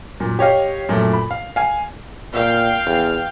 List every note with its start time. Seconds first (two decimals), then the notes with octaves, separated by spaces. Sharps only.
0.20 F#2 A#2
0.39 G4 C#5 D#5 F5
0.89 F#2 A#2 F3 A3
1.13 B5
1.31 F5
1.56 F5 G#5
2.34 A#2 F5 G5
2.86 E2